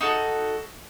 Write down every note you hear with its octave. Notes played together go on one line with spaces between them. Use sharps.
D#4 F#4 A4